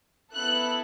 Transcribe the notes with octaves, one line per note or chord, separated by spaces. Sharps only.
B3 E4 A4 F#6